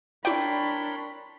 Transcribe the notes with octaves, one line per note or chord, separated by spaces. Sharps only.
D4 E4 A#4 C#5 D5 G5 B5 C6